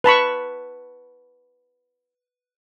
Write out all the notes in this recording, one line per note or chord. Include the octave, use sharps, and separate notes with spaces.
B4 A5 B5 C#6